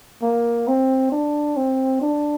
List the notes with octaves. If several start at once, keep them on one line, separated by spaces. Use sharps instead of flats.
A#3
C4
D4
C4
D4